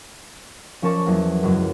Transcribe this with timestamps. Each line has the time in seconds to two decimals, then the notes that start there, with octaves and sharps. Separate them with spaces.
0.82 F3 C#4 A#4 A5 C#6 D6
1.06 E2 F#3 A#3
1.43 C#2 F#2 F#3